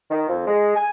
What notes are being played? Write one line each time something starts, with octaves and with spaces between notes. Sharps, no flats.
D#3
F2
G#3
G#5